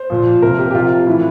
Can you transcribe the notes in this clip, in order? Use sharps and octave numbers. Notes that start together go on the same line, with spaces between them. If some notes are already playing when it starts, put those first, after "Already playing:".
Already playing: C5
A#2 F3
C3 F3 A#4
G4
G4
C3 F3 F4
A2 E3 E4